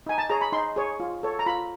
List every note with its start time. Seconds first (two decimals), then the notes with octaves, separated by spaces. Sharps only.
0.06 D#4 G#5
0.18 A5
0.29 G#4 C#5 A#5
0.41 B5
0.53 D#4 C6
0.76 G#4 C#5
1.00 F4
1.23 A4 C#5
1.39 A#5
1.46 F4 B5